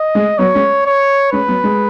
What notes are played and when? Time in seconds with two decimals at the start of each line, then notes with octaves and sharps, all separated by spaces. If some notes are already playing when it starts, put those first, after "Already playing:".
Already playing: D#5
0.15 G#3
0.38 F#3 B3 C#5
0.54 G#3 C#4
0.86 C#5
1.32 G#3 C#4 B4
1.48 F#3 B3
1.64 G#3